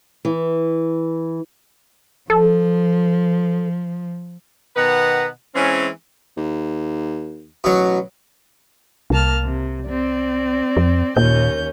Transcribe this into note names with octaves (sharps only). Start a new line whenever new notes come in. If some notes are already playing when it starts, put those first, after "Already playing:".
E3
F3 A4
B2 D#3 B3 B4 F#5 A#5
E3 G#3 C4 C#4
D#2
A1 B2 F#3
C2 A#3 A5 F6
C3
C4 D5
F2
D#2 A#2 C#4 G6